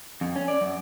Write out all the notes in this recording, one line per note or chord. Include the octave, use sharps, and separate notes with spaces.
F2
C#4
D5
F#2